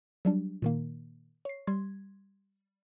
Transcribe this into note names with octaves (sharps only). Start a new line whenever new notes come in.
F#3 G3 D4
A#2 D#3 A#3
C#5 C7
G3 C6 G#6